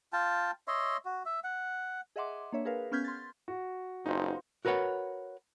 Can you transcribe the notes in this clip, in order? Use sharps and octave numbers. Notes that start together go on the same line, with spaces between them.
F4 G5 A5
C#5 D#5 E5 C6
F#4
E5
F#5
G#4 D#5 E5 F#5 C6 D6
A#3 D4 C#5 E5
G#4 A#4 B4 F5
B3 C#4 F6 G6 G#6 B6
C6 A6
F#4
F#1 B3 D#4 F4 C5
F#4 A#4 B4 C#5 F#5